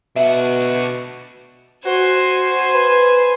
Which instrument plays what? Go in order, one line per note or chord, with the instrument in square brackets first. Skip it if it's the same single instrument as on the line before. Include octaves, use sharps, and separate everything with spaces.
[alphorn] B2 [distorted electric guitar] D4 F#4 [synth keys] E5
[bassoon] F#4 [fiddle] C5 G#5
[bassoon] B4